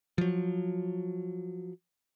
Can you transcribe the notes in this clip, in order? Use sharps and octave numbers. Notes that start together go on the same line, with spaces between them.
F3 F#3